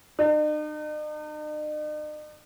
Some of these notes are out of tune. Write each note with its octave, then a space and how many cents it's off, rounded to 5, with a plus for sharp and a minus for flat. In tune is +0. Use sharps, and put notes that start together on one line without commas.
D#4 -45